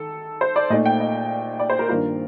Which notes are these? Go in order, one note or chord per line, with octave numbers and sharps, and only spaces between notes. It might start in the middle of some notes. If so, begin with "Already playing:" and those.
Already playing: D#3 A4
C5
D5
A#2 A3 D#4 D#5
G5
D#5
D5
C5
A#4
G2 D#3 A#3 F4 A#4